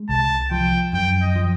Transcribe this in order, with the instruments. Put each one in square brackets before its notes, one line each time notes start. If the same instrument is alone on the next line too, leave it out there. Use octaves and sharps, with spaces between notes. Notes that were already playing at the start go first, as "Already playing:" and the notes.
Already playing: [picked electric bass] G#3
[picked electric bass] C2 [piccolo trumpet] A5
[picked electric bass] F3 [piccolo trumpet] G5
[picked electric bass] F#2 [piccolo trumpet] G5
[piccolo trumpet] D#5
[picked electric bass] F3